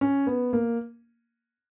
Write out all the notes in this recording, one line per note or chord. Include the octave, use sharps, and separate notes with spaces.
C#4
B3
A#3